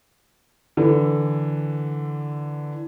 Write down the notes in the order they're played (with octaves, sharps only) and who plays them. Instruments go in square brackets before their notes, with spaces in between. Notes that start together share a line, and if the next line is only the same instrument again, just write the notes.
[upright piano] D3 E3